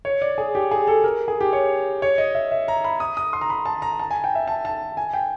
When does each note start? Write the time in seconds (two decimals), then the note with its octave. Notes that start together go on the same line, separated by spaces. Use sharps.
0.05 C#5
0.22 D5
0.38 G#4
0.55 G4
0.71 G#4
0.87 A4
1.04 A#4
1.28 G#4
1.41 G4
1.53 C#5
2.02 C#5
2.18 D#5
2.35 E5
2.52 E5
2.68 A#5
2.84 B5
3.00 D#6
3.17 D#6
3.33 C6
3.41 A#5
3.50 B5
3.65 A5
3.82 A#5
4.00 A5
4.11 G#5
4.24 G5
4.35 E5
4.48 A5
4.65 A5
4.97 G#5
5.14 G5